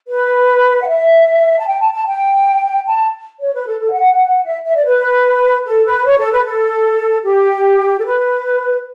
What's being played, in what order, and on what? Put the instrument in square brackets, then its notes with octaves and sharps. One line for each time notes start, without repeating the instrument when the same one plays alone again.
[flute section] B4
F#5
E5
A5
G5
A5
A5
G5
A5
C#5
B4
A4
A4
F#5
E5
E5
D5
B4
A4
B4
C#5
A4
B4
A4
G4
A4
B4